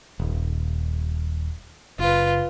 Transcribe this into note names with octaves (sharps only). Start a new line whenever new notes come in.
D#1
F#1 F4 B4